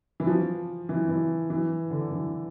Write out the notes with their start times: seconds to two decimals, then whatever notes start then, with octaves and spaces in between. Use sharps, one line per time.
0.20 E3
0.27 F3
0.89 E3
1.09 E3
1.50 E3
1.90 D3
2.11 E3